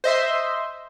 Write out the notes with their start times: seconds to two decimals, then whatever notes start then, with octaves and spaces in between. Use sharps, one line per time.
0.04 C5 D#5 E5 C6